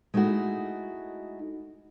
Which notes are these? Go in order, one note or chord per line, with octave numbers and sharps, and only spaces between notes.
G#3 A3 D#4 E4 F#4